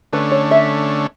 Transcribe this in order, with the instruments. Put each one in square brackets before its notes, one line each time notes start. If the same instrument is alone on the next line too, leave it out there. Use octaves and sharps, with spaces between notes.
[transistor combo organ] D3 A3 C#4 [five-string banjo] B4
[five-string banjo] C#5
E5